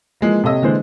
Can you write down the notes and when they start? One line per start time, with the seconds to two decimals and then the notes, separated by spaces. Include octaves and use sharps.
0.21 E3 F3 G#3 A#3
0.44 C3 A4 C#5 D#5 E6
0.62 D3 E3 G#3 C5